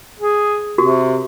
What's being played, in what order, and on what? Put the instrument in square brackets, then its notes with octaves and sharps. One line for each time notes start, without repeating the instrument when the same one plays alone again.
[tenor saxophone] G#4
[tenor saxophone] C3 [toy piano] F#4 G4 A#4